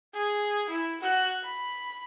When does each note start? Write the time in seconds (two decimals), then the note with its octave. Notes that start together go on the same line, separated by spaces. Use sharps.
0.14 G#4
0.70 E4
1.01 F#4 F#6
1.43 B5